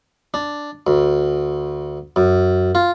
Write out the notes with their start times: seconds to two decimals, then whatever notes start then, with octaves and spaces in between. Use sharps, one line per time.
0.34 D4
0.87 D2
2.16 F#2
2.75 F4